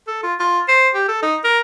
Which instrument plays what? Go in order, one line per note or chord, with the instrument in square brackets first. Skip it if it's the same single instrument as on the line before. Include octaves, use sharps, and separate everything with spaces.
[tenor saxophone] A4
F4
F4
C5
G4
A4
D#4
A#4